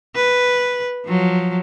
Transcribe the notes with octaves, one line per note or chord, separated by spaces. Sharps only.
B4
F3 F#3